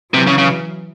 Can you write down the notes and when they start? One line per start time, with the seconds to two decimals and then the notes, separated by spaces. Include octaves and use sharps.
0.14 C3 E3 F#3
0.27 C#3
0.38 C#3